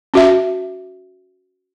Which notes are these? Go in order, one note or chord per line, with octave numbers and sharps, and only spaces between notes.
C#4 F#4 E5